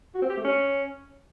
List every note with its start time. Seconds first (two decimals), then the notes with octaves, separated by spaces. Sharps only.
0.15 F#4
0.22 C4
0.30 G4
0.37 A3
0.45 C#4